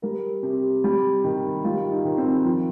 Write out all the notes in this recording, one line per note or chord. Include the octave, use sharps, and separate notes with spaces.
G3 A#4
C3 G4
G3
D#3
G3 F4
F4
D#4
D#3
C4
F3